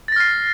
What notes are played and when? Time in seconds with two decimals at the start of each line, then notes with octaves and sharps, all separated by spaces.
0.08 A6
0.12 A#6
0.16 F6
0.20 C7